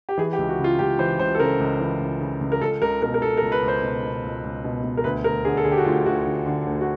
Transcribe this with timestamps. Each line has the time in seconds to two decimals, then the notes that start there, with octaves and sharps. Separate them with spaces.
0.09 G4
0.18 E3 G#4
0.33 G4
0.38 C#2
0.49 F#4
0.59 C#3
0.64 F4
0.79 C#2 G4
0.99 E3 C5
1.19 C#2 C5
1.35 A4
1.40 C#3 A#4
1.60 C#2
1.80 E3
2.00 C#2
2.21 C#3
2.41 C#2
2.52 A#4
2.61 C#2 A4
2.82 C#2 A#4
3.02 B2 A#4
3.14 A#4
3.22 B2 A4
3.37 A#4
3.42 C#2
3.52 B4
3.62 C#2
3.68 C5
3.83 B2
4.03 B2
4.24 C#2
4.44 C#2
4.64 B2
4.83 B2
4.97 A#4
5.04 D2 B4
5.24 D2 A#4
5.45 D3 G#4
5.57 A4
5.64 D3 G#4
5.72 G4
5.78 F#4
5.85 D2 F4
6.06 D2 F#4
6.25 D3
6.46 D3
6.66 D2
6.81 F#4